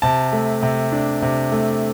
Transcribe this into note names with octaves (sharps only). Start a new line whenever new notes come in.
C3 A5
A3
C3
D4
C3
A3